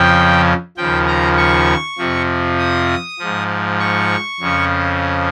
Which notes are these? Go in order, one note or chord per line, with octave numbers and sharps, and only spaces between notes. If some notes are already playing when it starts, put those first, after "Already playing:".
Already playing: F2 C#3 F3 G5
D#2 C#3 F3 G5
A#5
C#6
F2 C3 F3
D#6
G#2 F3
C#6
F2 C#3 F3